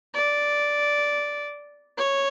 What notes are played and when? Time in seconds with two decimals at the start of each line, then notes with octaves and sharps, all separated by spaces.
0.14 D5
1.98 C#5